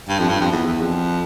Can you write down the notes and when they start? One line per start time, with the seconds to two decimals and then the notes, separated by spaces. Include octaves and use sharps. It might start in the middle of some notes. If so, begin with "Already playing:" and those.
0.08 G2
0.19 F2
0.29 G2
0.41 F2
0.52 E2
0.67 E2
0.81 F2